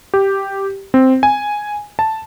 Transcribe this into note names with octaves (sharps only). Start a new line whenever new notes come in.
G4
C4
G#5
A5